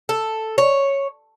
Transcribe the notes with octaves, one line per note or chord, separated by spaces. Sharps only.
A4
C#5